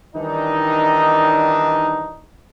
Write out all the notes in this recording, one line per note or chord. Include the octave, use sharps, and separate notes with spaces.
D#3 E3 G3 D4 D#4